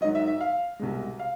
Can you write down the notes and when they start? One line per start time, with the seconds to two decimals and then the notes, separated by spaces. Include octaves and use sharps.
0.01 G#2 D#3 F#3 D#5
0.15 E5
0.27 E5
0.41 F5
0.79 C2 B2 G#3
1.19 F5